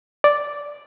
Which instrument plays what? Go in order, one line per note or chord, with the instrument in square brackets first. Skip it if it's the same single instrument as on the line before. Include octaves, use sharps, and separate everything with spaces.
[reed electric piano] D5